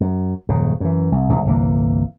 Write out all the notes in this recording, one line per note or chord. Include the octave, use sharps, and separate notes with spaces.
F#2
D#1 F#2 C#3
F#2 E3
C2
E1 C2 G#2
G1 C2 E3 A#3